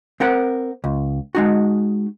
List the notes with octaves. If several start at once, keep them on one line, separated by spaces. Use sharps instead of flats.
C4 A#4 F#5
C#2
G#3 D#4 F#4